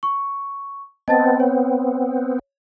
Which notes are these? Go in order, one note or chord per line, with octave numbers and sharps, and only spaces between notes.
C#6
B3 C4 D#5 A5 A6
C#5